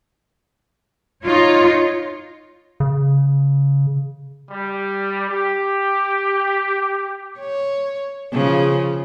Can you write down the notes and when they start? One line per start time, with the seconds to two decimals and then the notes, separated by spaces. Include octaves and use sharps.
1.23 D#4 F4 C#5
2.80 C#3
4.50 G3
5.29 G4
7.40 C#5
8.33 C#3 F3